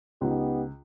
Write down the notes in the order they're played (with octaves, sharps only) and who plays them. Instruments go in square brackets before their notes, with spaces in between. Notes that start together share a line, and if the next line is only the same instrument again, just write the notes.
[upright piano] C#2 [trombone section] B3 D#4 G4